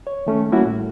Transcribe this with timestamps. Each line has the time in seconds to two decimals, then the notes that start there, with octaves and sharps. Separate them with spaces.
0.07 C#5
0.26 D#3 A3 C#4
0.51 G3 A#3 C#4 E4 F#4
0.66 A2